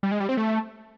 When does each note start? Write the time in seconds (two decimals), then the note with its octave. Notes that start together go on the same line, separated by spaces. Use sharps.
0.03 G3
0.12 G#3
0.20 G3
0.29 C4
0.37 A3